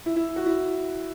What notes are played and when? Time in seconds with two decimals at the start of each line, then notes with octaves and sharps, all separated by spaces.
0.06 E4
0.16 E4
0.36 F#4
0.46 E4